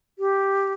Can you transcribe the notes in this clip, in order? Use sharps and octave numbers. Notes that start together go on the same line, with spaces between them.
G4